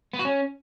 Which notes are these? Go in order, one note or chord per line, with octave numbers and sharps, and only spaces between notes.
B3
F#4
C#4